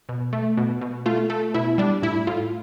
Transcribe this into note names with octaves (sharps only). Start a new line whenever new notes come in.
B2
A3
B2
B2
A3 F4
A3 A4
B2 E4
G3 D4
A2 E4
A2 F4